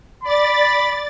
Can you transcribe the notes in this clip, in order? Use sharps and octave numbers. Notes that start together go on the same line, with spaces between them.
D5 B5 A6